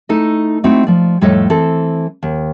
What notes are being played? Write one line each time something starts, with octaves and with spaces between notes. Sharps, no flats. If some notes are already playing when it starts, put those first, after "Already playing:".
A3 D#4 E4 A4 D#5
A3 C4 D#4 E4 F#4
F3 D5
F2 A2 G3 A4 C#5 D#5
E3 C4 A4
D#2